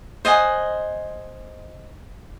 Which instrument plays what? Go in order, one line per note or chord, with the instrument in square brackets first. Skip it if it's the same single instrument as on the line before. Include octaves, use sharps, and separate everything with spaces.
[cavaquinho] C5 D#5 F#5 G#5